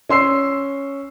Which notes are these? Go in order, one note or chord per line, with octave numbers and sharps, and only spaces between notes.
C#4 C6 E6 C7